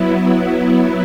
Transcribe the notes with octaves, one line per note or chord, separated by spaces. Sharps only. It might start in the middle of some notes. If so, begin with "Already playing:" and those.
Already playing: F#3 B3 E4